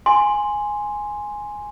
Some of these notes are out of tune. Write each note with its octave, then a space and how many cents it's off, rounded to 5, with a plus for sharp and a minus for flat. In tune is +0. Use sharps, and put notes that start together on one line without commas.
G#5 +0 C6 +0